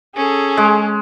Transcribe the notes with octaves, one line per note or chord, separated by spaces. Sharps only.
C#4 G#4 A4
G#3